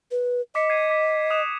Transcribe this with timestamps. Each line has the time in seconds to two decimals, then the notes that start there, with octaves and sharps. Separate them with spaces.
0.11 B4
0.55 D#5 D6 B6 C#7
0.70 G#6 C7 D#7
0.90 D6 B6
1.31 D#6 F#6 E7